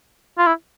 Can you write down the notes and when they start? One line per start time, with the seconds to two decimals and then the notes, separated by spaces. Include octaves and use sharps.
0.38 F4
0.47 E4